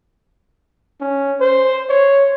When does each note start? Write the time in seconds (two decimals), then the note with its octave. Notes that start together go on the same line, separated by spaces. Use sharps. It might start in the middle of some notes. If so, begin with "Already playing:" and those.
1.01 C#4
1.41 C5
1.89 C#5